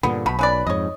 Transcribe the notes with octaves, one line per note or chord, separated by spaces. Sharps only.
G2 A#2 D3 B3
B1 B2 A3 B5
C#3 B4 D5
F2 G#2 C#5 D#5